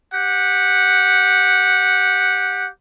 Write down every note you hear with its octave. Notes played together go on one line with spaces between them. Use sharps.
G4 F#5